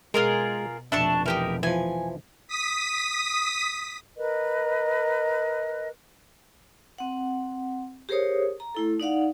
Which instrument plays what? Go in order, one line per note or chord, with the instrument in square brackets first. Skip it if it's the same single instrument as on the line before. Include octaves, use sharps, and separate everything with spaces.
[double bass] B2 [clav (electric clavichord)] G#3 [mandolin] F4 G#4 A#4
[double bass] F1 B2 [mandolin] D4 A5 C#6 [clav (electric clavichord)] E5
[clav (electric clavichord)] E3 [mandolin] D#4 G4 A#4
[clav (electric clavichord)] E3 F3 [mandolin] G#5
[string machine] D#6 B6
[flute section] A#4 B4 D#5
[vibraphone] C4 F#5
G4 G#4 A#4 C5 C#5 D#6
A#5
A3 E4 A4
D#4 D5 F5 F#5